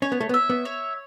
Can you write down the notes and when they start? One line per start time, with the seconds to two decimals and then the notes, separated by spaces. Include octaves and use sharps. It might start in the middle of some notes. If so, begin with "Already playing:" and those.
0.02 C#4 C#5
0.12 B3
0.21 A3
0.29 B3
0.34 E5
0.50 B3
0.65 C#5